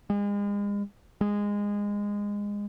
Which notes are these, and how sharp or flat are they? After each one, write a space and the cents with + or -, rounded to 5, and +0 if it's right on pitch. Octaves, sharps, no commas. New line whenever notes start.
G#3 -35
G#3 -20